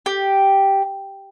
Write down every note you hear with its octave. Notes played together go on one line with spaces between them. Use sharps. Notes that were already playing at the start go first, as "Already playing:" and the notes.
G4